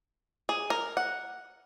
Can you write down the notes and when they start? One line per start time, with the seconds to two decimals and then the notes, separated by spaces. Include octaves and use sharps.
0.49 G#4
0.70 A#4
0.97 F#5